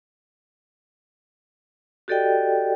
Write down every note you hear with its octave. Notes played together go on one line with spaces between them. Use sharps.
F#4 G4 A4 D5 D#5 G5